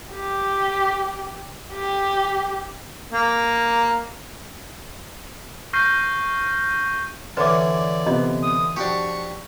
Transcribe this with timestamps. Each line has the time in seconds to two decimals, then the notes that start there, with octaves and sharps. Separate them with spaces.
0.14 G4
1.73 G4
3.13 A#3
5.73 C#6 F6 G6 A#6 C7 D#7
7.37 D3 E3 B4 C#5 D5 D6
8.06 C3 B3 F4 C5 D#5
8.43 D#6
8.76 F3 D4 F#4 G4 C#6